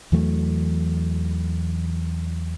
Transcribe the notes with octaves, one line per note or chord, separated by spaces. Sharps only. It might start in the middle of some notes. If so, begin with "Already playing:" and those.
E2 E3 F#3 A3